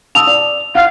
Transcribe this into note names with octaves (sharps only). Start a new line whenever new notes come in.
A5 D#6 E6 F7
D5
F5 F#5